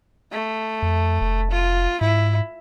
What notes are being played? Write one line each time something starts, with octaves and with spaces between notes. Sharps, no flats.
A3
F2
F1
F4
G#2 E4